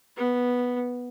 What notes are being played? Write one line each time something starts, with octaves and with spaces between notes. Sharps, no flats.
B3